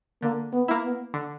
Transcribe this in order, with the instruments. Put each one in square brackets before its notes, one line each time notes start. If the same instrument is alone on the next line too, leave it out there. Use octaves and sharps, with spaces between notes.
[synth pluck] D3 [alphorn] A#3
[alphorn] B3
[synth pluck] A#3 E4
[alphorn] B3
[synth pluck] D3